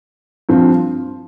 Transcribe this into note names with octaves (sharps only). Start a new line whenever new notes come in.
G2 F3 C4